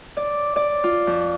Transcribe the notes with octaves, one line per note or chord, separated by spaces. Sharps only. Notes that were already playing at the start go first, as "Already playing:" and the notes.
D5
D5
F4
F2